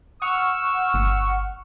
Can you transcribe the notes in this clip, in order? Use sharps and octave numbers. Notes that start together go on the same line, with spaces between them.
F#5 C#6 E6 F6
G1